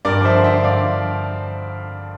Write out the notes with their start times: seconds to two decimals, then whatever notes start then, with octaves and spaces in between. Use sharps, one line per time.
0.05 G2 A#4 D5
0.20 F3 C5 E5
0.35 D3
0.44 C5 E5
0.50 D3
0.63 G2 D5 F5
0.79 F3
0.93 F3